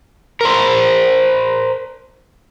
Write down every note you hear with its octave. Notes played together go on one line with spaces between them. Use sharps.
A#4 C5